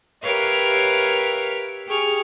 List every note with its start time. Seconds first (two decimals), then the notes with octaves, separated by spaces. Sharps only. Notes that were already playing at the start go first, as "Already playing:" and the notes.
0.23 G4 A#4 B4 C#5 E5 F5
1.87 G4 G#4 C#6 F6